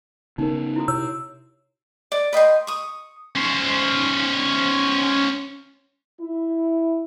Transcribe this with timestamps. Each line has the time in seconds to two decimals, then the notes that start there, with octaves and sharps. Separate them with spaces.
0.38 C#3 B3 C#4 D#4 A#4
0.76 E4 F#4 D#6
0.88 C3 C#5 E6
2.12 D5
2.33 B4 D#5 G5 C6
2.67 C#6 D#6
3.35 C#4 C5
6.20 E4